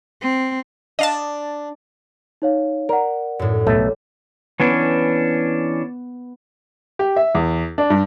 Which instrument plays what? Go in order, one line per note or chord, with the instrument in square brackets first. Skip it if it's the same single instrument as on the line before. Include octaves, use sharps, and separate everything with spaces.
[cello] C4
[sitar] D4 [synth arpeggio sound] D#5 F5 A5
[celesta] D#4 C#5 F5
[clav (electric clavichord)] A#4 [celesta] D5 F#5
[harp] F#2 A2
[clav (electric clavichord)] B1 A3 [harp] G3
[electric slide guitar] E3 C#4 D4 [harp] B3
[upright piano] G4
E5
E2
D4
G2